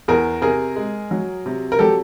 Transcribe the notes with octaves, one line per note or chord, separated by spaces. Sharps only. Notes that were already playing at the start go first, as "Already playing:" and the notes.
E2 G#4 A#4
C3 G#4 A#4
G#3
F#3
C3
A#4
F#3 G4 A4